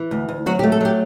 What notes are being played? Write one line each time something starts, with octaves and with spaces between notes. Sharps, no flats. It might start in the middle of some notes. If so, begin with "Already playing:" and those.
Already playing: E3
D2
D2
F#3 F#4
G4
A3
A4
F#3 G4